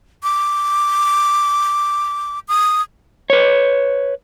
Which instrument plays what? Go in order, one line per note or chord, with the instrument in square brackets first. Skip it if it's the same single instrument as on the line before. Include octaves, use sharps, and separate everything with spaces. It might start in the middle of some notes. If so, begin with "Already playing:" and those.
[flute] D6
D#6
[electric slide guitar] B4 C#5